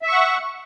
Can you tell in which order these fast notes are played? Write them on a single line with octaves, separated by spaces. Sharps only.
E5 C#6 F#5